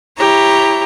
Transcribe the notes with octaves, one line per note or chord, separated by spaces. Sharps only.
E4 G4 C#5 A#5